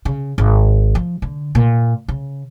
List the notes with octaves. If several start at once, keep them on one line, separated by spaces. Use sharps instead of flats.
C#3
G#1
F3
D3
A#2
C#3